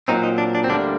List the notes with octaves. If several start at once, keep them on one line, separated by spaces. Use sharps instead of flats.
A#2 F#3 C4 D#4
D#4
D4
D4
C4
D2 D3 G3 A#3 D4